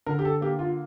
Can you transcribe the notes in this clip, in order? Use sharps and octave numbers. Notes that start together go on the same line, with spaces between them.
D3 A#4
G4
A4
A#3 G4
F4